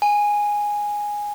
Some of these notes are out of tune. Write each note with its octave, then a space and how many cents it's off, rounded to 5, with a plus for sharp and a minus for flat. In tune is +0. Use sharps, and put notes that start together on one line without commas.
G#5 -5